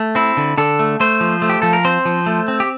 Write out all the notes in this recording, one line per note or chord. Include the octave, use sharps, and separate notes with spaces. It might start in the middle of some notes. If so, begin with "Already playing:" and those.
Already playing: A3
C4 E4
D3
D3 A4
A3
A3 C5
F3
A3
G4
F3 A4
A#4
C4 C5
F3
A3
C4
G4